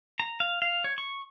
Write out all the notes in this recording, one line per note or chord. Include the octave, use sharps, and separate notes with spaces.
A#5
F5
F5
C#5
C#6